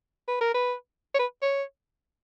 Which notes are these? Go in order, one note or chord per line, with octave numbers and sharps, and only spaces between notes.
B4
A#4
B4
C#5
B4
C#5